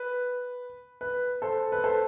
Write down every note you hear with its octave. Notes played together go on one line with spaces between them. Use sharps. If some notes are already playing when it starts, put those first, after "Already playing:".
Already playing: B4
B4
A4 C5
B4
A4 C5